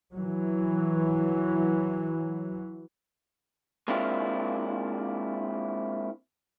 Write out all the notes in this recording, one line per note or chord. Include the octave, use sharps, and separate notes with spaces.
E3 F#3
G#3 A#3 C4 D4 E4 F4